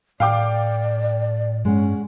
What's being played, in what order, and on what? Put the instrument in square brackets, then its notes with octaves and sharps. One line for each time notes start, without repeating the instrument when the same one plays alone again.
[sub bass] A2 [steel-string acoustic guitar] A4 [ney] D5 [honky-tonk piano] F5 G5 D6
[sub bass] G2 [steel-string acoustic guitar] G#3 F#5 [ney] C#4